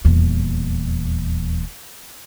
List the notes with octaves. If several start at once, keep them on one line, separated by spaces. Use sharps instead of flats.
D#1 E2